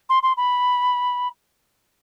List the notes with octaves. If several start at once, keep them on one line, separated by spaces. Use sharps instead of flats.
C6
C6
B5